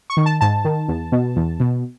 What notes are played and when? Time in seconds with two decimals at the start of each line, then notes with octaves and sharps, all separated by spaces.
0.10 C#6
0.17 D#3
0.26 A5
0.41 G#2 A5
0.65 D#3
0.88 E2
1.12 B2
1.36 E2
1.60 B2